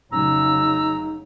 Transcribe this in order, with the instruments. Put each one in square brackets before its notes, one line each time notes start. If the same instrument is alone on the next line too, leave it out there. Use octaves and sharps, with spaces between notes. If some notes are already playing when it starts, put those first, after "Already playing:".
[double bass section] F1 C#3 F#3 [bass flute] D#4 [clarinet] A#5 [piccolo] E6